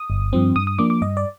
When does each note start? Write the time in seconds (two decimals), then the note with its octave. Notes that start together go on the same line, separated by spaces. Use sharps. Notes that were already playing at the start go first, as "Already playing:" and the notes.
Already playing: D#6
0.10 G1
0.33 G2 F3 C4
0.56 G2 D#6
0.67 D#6
0.79 F3 A#3 D4 D6
0.90 D6
1.02 G2 D#5
1.17 D5